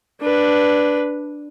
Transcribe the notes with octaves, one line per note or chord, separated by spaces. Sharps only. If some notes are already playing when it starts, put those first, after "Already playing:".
D4 B4